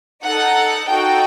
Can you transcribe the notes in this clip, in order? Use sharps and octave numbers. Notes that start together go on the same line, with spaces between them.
D#4 A4 F#5
D#4 F#4 A4 G5